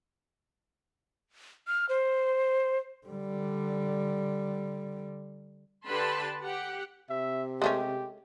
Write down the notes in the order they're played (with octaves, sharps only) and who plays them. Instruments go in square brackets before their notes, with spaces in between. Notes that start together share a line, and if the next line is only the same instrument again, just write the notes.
[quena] F6
C5
[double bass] D3 G3
[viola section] D3 G4 B4 A5 B5 C6
G4 F#5
[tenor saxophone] C3 [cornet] E5
[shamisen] G#3 A3 C#4 [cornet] G4